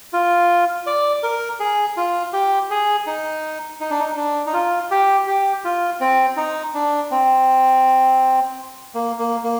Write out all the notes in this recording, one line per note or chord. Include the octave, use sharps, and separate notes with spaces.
F4
D5
A#4
G#4
F4
G4
G#4
D#4
D#4
D4
D#4
D4
D#4
F4
G4
G4
F4
C4
D#4
D4
C4
A#3
A#3
A#3